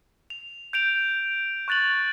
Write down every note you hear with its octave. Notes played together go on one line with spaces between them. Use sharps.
F7
G6 D7 F7
C#6 F#6 A6 F7 F#7